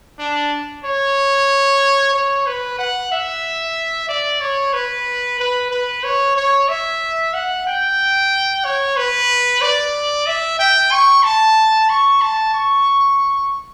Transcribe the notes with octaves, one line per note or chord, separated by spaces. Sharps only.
D4
C#5
C#5
B4
F#5
E5
D5
C#5
B4
B4
B4
C#5
C#5
E5
F#5
G5
C#5
B4
D5
E5
G5
C#6
A5
C#6
A5
C#6